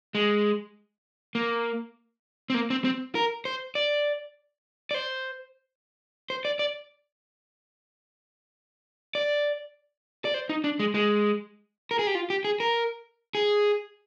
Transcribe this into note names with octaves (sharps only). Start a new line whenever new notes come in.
G#3
A#3
C4
A#3
C4
C4
A#4
C5
D5
D5
C5
C5
D5
D5
D5
D5
C5
D#4
D4
G#3
G#3
A#4
G#4
G4
F4
G4
G#4
A#4
G#4